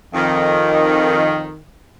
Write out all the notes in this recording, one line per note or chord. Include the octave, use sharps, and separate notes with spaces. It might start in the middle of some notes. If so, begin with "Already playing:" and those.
F2 D#3